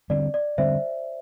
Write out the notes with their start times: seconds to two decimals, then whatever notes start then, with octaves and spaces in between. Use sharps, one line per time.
0.10 D3 G3 C4 D5
0.34 D5
0.58 D3 G3 C4 C5 E5